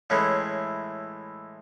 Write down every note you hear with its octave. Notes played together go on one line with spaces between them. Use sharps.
A2 E3 G#3 C#4